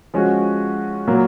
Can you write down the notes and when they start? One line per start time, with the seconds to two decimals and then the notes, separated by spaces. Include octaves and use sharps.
0.14 F3 G#3 C#4 F#4
1.07 A#2 F#3 A#3